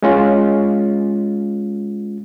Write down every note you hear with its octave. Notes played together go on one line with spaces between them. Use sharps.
G#3 C#4 F4